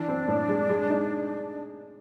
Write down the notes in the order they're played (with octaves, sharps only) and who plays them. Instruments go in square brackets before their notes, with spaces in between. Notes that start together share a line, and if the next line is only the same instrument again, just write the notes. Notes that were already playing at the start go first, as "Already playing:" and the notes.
Already playing: [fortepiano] E3 [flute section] D4
[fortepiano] C4
A2
G#3
G#3
D#4